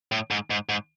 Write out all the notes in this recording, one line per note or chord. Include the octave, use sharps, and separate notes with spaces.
A2
G#2
G#2
G#2